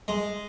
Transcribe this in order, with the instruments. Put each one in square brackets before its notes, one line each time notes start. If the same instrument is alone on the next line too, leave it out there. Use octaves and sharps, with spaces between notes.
[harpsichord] G#3